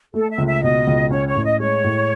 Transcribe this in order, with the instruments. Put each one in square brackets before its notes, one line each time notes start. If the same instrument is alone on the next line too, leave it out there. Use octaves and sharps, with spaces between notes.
[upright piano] A3 [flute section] A4
[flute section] E5
[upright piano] C#2
[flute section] E5
[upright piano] B2 [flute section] D#5
[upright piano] C#2
[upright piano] C#4 [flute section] C#5
[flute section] C#5
[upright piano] A2
[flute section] D#5
[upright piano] G#3 [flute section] C#5
[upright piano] A2